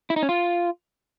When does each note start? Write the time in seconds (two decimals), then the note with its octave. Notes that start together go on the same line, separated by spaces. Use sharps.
0.10 E4
0.16 D#4
0.23 C#4
0.29 F4